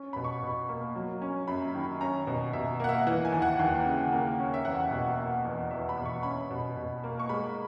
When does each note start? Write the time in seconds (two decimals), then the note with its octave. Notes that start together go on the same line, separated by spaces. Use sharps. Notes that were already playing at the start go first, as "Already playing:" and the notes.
Already playing: C#4
0.13 B2 B5
0.24 C#6
0.43 B2
0.69 A#3
0.96 F#3
1.22 C#4
1.48 F#2 B5
1.75 D#3
2.01 C#4 A#5
2.27 B2
2.53 B2 E5
2.80 A#3 F#5
2.89 E5
3.07 E3 F#5
3.25 G#5
3.33 D#2
3.42 F#5
3.59 D#2
3.86 C#3
4.12 A#3
4.39 C#4
4.54 E5
4.65 E2 F#5
4.91 B2
5.18 A#3
5.45 E2
5.71 E2 E5
5.89 B5
5.97 B2
6.05 C#6
6.23 C#4 B5
6.51 B2
6.76 B2
7.04 A#3
7.20 C#6
7.29 G#3 B5